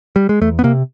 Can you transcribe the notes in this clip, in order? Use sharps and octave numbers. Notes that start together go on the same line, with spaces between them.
G3
G#3
E2 A3
B3
C3 A#3